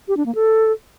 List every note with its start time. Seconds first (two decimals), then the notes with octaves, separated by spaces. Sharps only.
0.08 G4
0.17 D4
0.26 A#3
0.35 A4